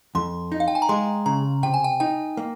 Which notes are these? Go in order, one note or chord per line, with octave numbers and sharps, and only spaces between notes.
F2 C6
D#4
F5
G5
G#5
A#5
G#3 C6
C#3 A#5
C3 G5
G#5
G5
D#4 G5
A#3